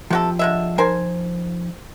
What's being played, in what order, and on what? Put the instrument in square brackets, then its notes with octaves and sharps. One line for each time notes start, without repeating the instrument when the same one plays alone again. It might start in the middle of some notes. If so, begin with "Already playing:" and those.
[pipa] C3 F#4 A4 [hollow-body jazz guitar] F3 G4
[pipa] D3 G#3 E5
[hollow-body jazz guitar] F3 D#4 A5 [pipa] A#4 C5 G#5